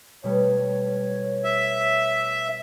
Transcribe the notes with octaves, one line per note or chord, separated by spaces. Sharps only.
B2 G3 A3 C#5
E5